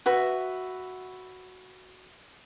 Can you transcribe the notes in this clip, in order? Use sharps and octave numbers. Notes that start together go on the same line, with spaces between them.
F#4 B4 E5